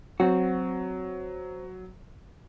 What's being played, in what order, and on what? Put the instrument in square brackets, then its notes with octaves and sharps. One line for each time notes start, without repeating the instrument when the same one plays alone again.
[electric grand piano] F#3 [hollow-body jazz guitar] C4 F#4